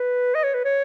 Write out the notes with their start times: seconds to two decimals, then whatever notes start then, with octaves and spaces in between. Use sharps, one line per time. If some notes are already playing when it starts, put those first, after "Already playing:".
Already playing: B4
0.35 D#5
0.44 C#5
0.54 B4
0.64 C#5